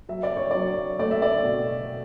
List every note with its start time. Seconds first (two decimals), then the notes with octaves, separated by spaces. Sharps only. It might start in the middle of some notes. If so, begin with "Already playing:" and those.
0.09 F#3 E5
0.23 D5
0.37 C#5
0.51 F#3 D5
0.99 A3 D5
1.11 E5
1.22 D5
1.44 B2